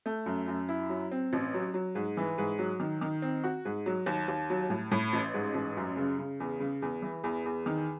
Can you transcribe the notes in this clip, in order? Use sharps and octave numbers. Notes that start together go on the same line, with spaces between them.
A3
F#2
F#2
E4
F#3
C4
A1
F#3
F#3
G#2
E3
G#2
F#3
D#3
D#3
C4
F#4
G#2
F#3
D#2
D#2
F#3
A2
A2
A1
G#2
A1
F#2
C#3
C#3
E2
C#3
E2
E3
E2
E2
D#3